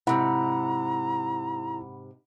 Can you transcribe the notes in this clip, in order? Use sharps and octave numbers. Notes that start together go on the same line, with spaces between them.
G#2 C3 E4 F#5 A#5 B5 E6